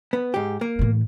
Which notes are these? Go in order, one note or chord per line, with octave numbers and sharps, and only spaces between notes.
B3
G#2 G4
A#3
A2 E3